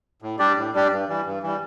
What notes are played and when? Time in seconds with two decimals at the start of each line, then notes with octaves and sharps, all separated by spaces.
0.22 A2
0.39 G3 D4 G4 D5
0.57 A2
0.73 G3 D4 G4 D5
0.91 G2
1.08 E3 G3
1.25 G2
1.43 E3 G3